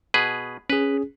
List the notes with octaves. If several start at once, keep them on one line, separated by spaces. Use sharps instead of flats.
B2 G#4 B4
C#4 G#4 B4